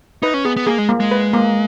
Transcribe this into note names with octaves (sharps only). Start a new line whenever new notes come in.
D#4 B4
C#4
B3 G#4
B3
A#3 G#4
G#3
A#3
G#3
B4
A#3